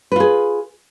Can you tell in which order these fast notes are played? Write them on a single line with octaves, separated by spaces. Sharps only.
B4 F4 G#4